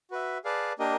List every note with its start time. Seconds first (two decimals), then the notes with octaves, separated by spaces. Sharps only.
0.11 F#4 B4 E5
0.44 G#4 B4 D5 F5 A5
0.79 A#3 D4 G4 A#4 D#5